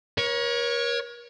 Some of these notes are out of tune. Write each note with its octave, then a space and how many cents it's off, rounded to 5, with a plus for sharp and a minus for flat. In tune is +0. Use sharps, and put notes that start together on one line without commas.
A#4 +40 C#5 +0